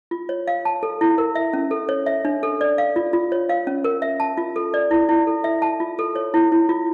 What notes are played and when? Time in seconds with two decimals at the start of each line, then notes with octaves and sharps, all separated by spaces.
0.11 F4
0.29 C#5
0.48 F5
0.65 A5
0.83 A4
1.01 E4
1.18 A#4
1.35 E5
1.53 C#4
1.71 A4
1.89 C#5
2.06 E5
2.25 D4
2.43 A4
2.61 D5
2.78 F5
2.96 F4
3.13 F4
3.32 C#5
3.49 F5
3.67 C#4
3.84 A#4
4.02 E5
4.20 A5
4.37 F4
4.56 A4
4.74 D5
4.91 E4
5.09 E4
5.27 A4
5.44 E5
5.62 A5
5.80 F4
5.99 A4
6.16 C#5
6.34 E4
6.52 E4
6.69 F4